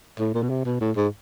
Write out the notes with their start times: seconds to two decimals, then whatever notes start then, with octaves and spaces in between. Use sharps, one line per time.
0.19 A2
0.34 A#2
0.42 B2
0.50 C3
0.65 B2
0.81 A2
0.96 G#2